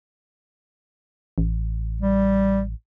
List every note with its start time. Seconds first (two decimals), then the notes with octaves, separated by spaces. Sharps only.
1.38 A1
2.01 G3